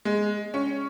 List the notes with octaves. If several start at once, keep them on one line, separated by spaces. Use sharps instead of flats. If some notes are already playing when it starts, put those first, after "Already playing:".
G#3
C#4